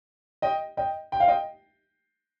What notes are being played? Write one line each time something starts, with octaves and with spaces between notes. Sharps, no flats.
D#5 G5
D#5 G5
G5
F5
D#5 G5